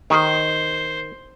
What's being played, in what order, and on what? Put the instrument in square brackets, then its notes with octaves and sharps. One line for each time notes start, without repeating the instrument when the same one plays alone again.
[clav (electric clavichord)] D#3 [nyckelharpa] C5